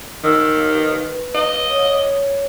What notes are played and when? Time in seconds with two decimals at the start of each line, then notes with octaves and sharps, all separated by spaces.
0.24 D#3 E6
0.76 B4
1.35 D#5
1.69 C#5